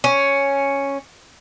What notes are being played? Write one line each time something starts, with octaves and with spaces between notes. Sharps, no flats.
C#4